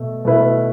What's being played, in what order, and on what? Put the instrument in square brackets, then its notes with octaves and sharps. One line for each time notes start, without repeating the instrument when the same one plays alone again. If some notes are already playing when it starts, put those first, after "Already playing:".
Already playing: [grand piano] B2 A3
B2 A3 E4 B4